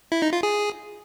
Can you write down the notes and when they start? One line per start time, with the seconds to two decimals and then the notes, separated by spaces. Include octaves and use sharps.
0.12 E4
0.22 D#4
0.33 F4
0.43 G#4